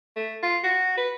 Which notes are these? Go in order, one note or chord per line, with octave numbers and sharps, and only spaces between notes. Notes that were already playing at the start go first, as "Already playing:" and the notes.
A3
F4
F#4
B4